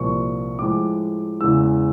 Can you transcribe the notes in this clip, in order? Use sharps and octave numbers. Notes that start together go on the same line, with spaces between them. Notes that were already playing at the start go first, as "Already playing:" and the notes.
Already playing: C2 A#2 F3 C#6
A2 F3 G#3 D6
E2 C#3 E3 G#3 E6